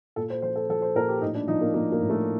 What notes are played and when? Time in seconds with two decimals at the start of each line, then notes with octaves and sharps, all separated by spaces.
0.16 A#2 A4
0.30 C5
0.42 F3 C5
0.56 A4
0.69 F3 A4
0.82 C5
0.95 A#2 A#4
1.08 G4
1.21 A2 D#4
1.35 D4
1.48 F3 D#4
1.61 A#3
1.74 F3 A#3
1.92 A#3
2.01 A2
2.10 A3